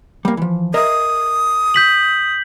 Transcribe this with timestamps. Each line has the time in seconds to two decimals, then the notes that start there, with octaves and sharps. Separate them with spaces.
0.25 G3 A#3
0.37 E3 F3
0.74 A#4 D#5 E5 D#6
1.74 G6 B6 F#7